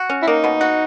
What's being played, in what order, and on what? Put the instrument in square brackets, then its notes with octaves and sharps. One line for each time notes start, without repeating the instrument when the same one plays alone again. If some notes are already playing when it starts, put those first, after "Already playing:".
Already playing: [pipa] F#4
C#4
[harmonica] E4
[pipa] A#3 [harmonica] D#4
[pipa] B2
F#4